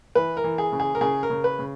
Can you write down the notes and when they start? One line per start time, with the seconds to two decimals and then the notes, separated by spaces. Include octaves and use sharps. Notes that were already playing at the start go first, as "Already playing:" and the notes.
0.15 E3 B4
0.37 A#4
0.44 E3
0.58 G#4
0.72 C#3
0.80 G#4
0.95 A#4
1.01 C#3 G#4
1.23 A#4
1.30 C#3
1.44 B4
1.59 C#3